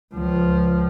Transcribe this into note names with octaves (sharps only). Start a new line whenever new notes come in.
C#2 F3